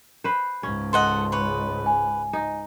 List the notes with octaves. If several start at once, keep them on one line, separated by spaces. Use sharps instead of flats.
B4 C5
C#2 G#2 C#4
A4 D#5 F#5 C6
B4 C#5
G#5
D#4